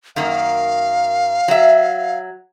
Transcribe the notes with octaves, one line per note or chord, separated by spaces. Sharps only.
F#2 D#3 A#3 F5
F#3 E5